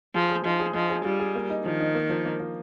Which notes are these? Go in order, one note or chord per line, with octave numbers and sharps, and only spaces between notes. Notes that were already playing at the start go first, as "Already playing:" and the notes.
F3 G#4
G#4
F3 D#4
G#4
F3 D#5
G#4
G3 F4
G#4
A#3
D#4
D#3 F3
D#4
A#3
F3
A#3
F3